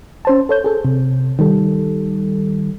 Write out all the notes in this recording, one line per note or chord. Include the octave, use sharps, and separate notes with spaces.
C#4 C5 A5
A4 C#5 G6
G#4 A4
C3
D#3 G3 A4